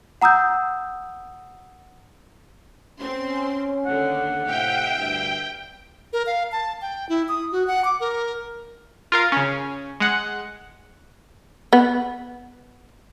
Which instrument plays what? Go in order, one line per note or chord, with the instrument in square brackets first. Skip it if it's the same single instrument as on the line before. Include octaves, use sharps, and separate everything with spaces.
[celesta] F#5 A#5 D#6 E6 G6
[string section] C4 C6 [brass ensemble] C#4
[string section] D#2 D3 [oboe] F#5
[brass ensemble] A2 C3 [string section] E5 F5 [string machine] G5
[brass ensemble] D2 G2
[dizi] A#4
F5
A5
G5
E4
D#6
F#4
F#5
D6
A#4
[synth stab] F4 A#4 F5
C#3 C#4
G#3 F#5
[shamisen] B3